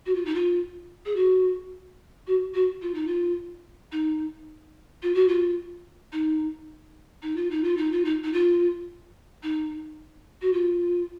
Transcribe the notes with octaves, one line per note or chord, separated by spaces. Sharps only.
F#4
F4
D#4
F4
G#4
F#4
F#4
F#4
F4
D#4
F4
D#4
F4
F#4
F4
D#4
D#4
F4
D#4
F4
D#4
F4
D#4
D#4
F4
D#4
F#4
F4